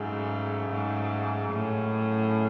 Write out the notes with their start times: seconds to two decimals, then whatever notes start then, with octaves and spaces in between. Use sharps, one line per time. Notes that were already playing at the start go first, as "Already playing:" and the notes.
Already playing: G#2 C#3 F#3 A3
0.70 G#2
1.51 F#2 A2 C#3 F#3 C#4 E4